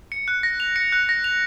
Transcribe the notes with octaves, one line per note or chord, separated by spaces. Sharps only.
C#7
F#6
A#6
F7
C#7
F#6
A#6
F7